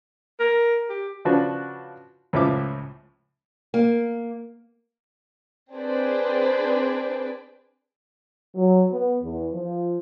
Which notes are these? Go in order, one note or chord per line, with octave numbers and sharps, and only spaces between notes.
A#4
G4
C#3 F3 D4 F#4 B4
C#2 A2 F3 E5 D6
A#3
C4 D4 G#4 B4 C5 D5
F#3
B3
E2
F3